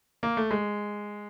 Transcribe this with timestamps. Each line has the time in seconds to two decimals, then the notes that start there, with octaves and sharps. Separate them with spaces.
0.23 A#3
0.37 A3
0.51 G#3